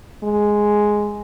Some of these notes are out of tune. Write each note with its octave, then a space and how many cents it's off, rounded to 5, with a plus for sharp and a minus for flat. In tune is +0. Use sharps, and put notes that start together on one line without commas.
G#3 +0